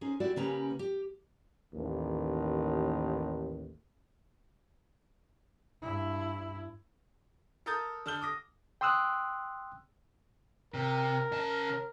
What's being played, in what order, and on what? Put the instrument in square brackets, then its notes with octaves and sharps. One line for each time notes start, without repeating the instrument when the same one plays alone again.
[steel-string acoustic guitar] C#4 D#4 G#4 C5
G#3 E4 F#4 G4 D5 E5
C#3 A#3 C#4 G4 B4 A#5
G4
[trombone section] A1 D#2
[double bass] G2 E4
[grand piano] A4 A#4 A#5 D#6 G6 A6
D3 A5 F6 G6 G7
D6 D#6 A#6
[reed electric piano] G5 C6 D#6 E6 F#6
[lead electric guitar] C3 [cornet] A#4
[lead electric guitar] C#3 A5